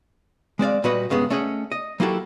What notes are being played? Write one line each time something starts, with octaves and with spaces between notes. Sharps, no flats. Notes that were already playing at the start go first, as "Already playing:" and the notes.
G#3 C4 D5 F5
A#2 G3 F#4 B4 D#5 F#5
G2 C#3 G#3 B3
A3 C#4 G#4 D#5 F#5
D#5
F#3 A#3 E4 F#4 G4 A4